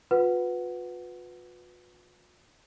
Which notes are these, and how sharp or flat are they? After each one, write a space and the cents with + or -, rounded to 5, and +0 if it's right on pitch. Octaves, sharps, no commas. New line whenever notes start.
F4 +45 B4 +5 F#5 +0